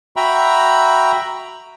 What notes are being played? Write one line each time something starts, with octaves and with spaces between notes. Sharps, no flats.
F#4 E5 G5 A#5 B5